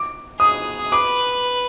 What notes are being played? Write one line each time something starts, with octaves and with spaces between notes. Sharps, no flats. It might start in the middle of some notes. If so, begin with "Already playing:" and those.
Already playing: D6
G#4 D#6
B4 D6